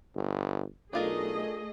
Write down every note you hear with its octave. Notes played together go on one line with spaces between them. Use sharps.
G1
B1 A3 D4 F4 G#4 A#4 D#5